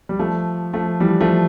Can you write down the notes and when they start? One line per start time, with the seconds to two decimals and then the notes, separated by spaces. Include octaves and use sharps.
0.09 G3
0.19 F3 A3
0.73 F3 A3
1.00 E3 G3
1.21 F3 A3